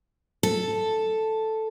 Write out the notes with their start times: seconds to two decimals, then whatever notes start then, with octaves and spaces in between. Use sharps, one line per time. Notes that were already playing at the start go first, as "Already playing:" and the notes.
0.43 A4